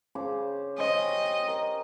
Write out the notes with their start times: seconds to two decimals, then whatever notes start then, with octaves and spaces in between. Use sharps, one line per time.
0.15 C#3 C5 D6
0.78 C#4 G4 C5 D#5
1.47 A#4